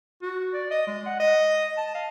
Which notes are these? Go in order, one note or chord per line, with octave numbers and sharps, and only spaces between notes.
F#4
D5
D#5
G#3
F#5
D#5
A5
F5